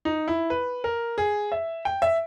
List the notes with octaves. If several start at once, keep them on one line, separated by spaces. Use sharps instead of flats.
D#4
E4
B4
A#4
G#4
E5
G5
E5